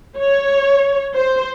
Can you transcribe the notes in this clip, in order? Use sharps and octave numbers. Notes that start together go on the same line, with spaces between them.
C#5
C5